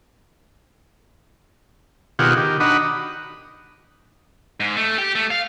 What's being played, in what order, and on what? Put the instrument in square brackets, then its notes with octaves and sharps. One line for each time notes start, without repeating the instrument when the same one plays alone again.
[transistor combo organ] B2 D#3 F4 G4 G#4 F#5
D#3 G4
D4 D#4 F#4 D#5 F#5 B5
[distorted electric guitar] G#2
A3
G4
A3
F5